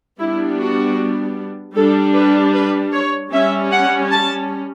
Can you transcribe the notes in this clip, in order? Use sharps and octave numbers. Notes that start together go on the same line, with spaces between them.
G3 B3 D4 E4
F#4
G3 D4 A4
B4
B4
C#5
G3 C#4 E5
F#5
A5